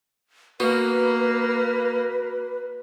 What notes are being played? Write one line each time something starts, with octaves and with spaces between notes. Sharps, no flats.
A#3 B3 F#4 B4